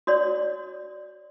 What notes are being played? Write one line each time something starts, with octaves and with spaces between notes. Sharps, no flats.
F#4 C#5 D5